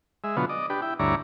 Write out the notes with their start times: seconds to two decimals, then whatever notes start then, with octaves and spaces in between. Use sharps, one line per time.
0.24 G#3 E5
0.37 B2 D3 F#3 B3 F4
0.49 D5 D#5
0.70 D4 G4 B4
0.82 E4 G5
0.99 D2 G2 E4 C#5 D5 A#5